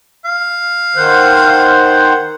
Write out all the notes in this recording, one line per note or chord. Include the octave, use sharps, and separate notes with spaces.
F5
D#3 C5 F#5